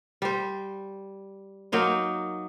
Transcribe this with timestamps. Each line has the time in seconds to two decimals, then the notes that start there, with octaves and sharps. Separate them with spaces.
0.22 G3 C5
1.72 F#3 A#3 D#4 C5